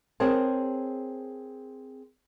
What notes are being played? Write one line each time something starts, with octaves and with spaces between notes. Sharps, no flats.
C4 G#4 A#4 C5 C#5 A5